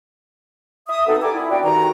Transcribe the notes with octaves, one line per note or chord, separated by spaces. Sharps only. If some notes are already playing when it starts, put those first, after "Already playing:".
E5 D#6
B2 B3 C4 D#4 A4
G4 A#4 D5 G#5 D6
E4
B2 D4 F#4 D5 G5
D2 G2 D#3 D#4 F#4 A#5